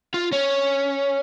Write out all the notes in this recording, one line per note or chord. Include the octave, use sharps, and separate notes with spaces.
F4
C#4